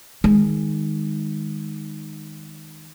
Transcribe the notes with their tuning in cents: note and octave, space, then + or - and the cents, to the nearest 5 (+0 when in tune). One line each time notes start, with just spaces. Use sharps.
D#3 +0 G#3 -15